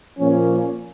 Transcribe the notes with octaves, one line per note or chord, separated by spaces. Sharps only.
A#2 F3 A#3 C#4